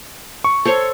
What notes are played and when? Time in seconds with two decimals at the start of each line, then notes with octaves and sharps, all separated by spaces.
0.44 C#6
0.65 A4 C5 C#5